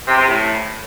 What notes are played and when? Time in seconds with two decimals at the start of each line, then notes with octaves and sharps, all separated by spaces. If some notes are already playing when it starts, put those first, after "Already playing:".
0.08 C3
0.18 C3
0.28 A2